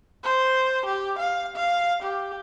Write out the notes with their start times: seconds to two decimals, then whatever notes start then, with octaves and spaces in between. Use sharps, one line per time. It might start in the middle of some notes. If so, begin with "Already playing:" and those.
0.24 C5
0.85 G4
1.18 F5
1.56 F5
2.02 G4